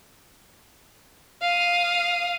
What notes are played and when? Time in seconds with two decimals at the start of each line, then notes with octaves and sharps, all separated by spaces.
1.42 F5 D#6